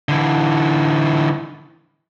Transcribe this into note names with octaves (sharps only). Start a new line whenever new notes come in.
D3 E3